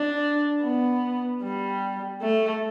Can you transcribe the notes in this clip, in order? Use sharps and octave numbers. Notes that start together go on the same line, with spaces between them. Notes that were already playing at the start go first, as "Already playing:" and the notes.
Already playing: D4
B3
G3
A3